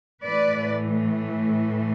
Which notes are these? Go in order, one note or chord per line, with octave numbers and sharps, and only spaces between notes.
A2 E3 A3 B4 D5